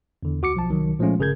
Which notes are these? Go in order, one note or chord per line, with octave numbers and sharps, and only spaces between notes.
E2 D3
D2 F#4 D6 C#7
B1 F3 A5
C2 D#3 F#3
A#2 F3 G#3 A3 C#4 F4
G1 C#3 G#4 A#4 G6 G#6